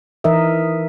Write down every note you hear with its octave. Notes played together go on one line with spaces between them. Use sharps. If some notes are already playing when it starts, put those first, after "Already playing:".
E3 D#4 A#4 D#5 E5